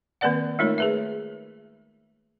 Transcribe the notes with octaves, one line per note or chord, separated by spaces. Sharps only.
D#3 A#3 C4 B4 D5 F#5
G#3 A3 D#4 F4 A#4 C#5
G#4 B4 E5